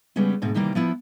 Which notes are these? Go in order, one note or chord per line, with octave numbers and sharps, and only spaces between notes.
C#3 G3 G#3 B3 C#4
D2 G#2 B2
C3 D#3 E3 G3 A#3
F3 B3 E4